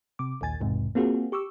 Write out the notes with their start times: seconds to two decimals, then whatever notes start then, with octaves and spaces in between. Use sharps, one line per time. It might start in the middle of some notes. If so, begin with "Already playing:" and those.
0.19 C3 D6
0.41 A#1 D#2 G#5 A6
0.60 B1 E2 G#2 C3
0.95 A#3 C4 F4 F#4 G#4
1.32 G4 C#6 D6 E6